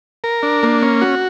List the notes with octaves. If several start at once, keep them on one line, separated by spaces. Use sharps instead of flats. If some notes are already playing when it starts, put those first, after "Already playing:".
A#4
D4
A#3
C#4
F#4